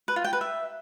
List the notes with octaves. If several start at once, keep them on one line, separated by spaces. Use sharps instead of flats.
B4
F4
G5
B4
E5